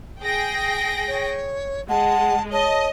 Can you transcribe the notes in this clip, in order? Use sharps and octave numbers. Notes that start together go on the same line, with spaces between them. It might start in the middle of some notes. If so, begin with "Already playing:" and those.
G#4 G5 A#6
C#5
G#3 F#5 A5
C#5 D#5 A5